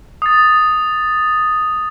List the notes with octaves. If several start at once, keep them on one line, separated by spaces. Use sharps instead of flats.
D#6 A6